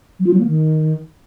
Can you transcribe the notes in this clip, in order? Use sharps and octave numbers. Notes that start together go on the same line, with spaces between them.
F#3
F4
F#3
A#3
D#3